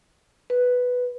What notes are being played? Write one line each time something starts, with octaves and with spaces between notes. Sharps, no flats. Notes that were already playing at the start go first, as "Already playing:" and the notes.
B4